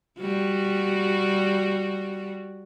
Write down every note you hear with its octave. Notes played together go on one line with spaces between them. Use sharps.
G3 F#4